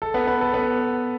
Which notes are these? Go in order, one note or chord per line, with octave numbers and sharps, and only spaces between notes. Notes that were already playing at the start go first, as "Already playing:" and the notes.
A4
B3 B4
B3 B4
A4
B3 B4